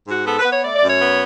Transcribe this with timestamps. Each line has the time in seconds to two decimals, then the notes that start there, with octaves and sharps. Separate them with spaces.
0.08 G#2 F#4
0.26 B3 A4
0.39 B4
0.45 B3
0.52 C#5
0.64 A3 D5
0.76 D5
0.83 F#2 C#5
1.01 B3